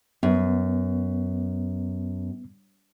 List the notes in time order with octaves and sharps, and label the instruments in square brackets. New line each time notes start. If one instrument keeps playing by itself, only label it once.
[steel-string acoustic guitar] F#2 [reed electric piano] B3